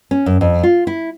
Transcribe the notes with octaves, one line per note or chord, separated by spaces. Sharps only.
C#4
F#2
F2
F4
E4